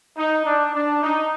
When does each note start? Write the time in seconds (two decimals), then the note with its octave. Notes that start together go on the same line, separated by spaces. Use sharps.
0.18 D#4
0.46 D4
0.74 D4
1.03 D#4